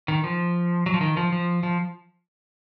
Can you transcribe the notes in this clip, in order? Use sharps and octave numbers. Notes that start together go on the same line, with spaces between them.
D#3
F3
F#3
F3
D#3
F3
F3
F3